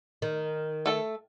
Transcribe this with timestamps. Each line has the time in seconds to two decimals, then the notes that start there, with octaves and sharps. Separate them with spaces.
0.22 D#3
0.86 A3 A4